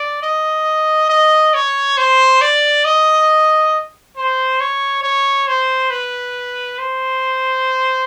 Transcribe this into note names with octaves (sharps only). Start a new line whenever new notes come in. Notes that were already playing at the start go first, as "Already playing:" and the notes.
Already playing: D5
D#5
D#5
C#5
C5
D5
D#5
C5
C#5
C#5
C5
B4
C5